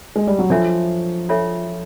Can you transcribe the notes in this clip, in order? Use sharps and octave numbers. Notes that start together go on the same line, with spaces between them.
G#3
G3
F#3
F3 D4 F4 A4 C#5 E5
D4 F4 A4 C#5 E5